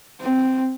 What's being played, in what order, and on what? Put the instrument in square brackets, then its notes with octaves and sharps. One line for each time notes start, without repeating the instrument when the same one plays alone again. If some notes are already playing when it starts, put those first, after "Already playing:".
[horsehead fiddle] C4